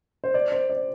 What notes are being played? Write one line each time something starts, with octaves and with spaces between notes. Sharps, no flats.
C5
D5
C5
D5